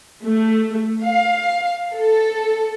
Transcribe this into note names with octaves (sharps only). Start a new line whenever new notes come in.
A3
F5
A4